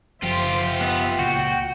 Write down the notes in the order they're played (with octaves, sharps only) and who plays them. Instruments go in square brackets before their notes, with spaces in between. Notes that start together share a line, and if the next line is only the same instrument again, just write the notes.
[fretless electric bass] F#1 F3 [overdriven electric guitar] F4 G4 [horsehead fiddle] C5 E5
[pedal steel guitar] B3 [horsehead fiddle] E5
[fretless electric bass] C#2 A#2 [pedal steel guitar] F#4 [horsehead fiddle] G5